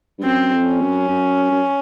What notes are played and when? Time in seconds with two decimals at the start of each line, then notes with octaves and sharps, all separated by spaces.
0.19 G2
0.23 F#2 C4
0.52 F2
0.66 C#4
0.81 F#2
1.09 F#2
1.51 F#2